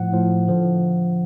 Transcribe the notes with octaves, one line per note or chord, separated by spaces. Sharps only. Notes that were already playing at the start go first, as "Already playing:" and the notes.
Already playing: A2 F3 F#5
A2 F3
D3 F3